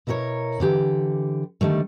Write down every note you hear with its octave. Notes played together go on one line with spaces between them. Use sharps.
B2 E4 A#4 B4 C#5
D3 E3 G4
D3 D#3 G3 A3